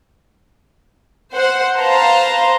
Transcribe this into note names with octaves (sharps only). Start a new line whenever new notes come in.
C5 F#5
B4 C5 F5 A5 A#5 C6